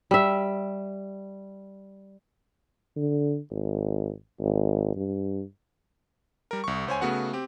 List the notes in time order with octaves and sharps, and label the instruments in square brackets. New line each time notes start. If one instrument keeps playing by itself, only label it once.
[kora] G3 E5
[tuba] D3
G#1
G#1
G2
[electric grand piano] G3 A#4
C2 C#6
C#2 C5 C#5 G#5
C#3 A3 B3 F#4 F#5
C4 G4